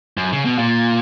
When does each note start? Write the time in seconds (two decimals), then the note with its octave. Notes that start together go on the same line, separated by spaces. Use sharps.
0.17 F#2
0.32 C#3
0.45 B2
0.58 A#2